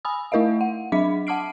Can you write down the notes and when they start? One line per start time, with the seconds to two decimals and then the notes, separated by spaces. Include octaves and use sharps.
0.05 G#5 B5 D#6 E6
0.32 A3 E4 A#4 D#5 F5
0.61 F#5
0.92 F#3 D4 E5 B5 D6 B6
1.27 F#5 A5 D6 F6 C7 D7